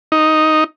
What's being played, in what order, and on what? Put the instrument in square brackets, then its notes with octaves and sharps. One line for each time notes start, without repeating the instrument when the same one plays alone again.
[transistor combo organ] D#4